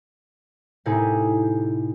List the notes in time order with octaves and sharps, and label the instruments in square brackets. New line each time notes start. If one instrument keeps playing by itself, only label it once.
[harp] A2 C3 D#4 E4 G4 G#4